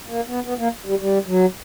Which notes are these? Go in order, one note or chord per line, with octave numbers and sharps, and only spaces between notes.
A#3
B3
B3
A#3
G3
G3
F#3